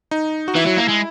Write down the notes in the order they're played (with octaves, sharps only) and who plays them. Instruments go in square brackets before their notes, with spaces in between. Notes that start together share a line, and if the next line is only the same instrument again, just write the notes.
[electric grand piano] D#4
F#4
[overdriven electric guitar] E3 [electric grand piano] E4
[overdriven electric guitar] F#3
A#3
G#3